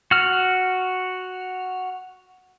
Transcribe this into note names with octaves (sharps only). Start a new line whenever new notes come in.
F#4 F6